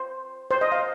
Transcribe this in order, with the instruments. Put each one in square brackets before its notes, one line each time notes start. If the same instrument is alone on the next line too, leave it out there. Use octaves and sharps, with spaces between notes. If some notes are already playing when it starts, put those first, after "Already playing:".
Already playing: [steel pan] C5
C5
D#5
F5